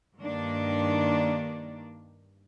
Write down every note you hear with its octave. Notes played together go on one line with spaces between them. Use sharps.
G2 D#3 A#3 D4